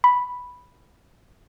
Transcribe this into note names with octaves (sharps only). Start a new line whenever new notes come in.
B5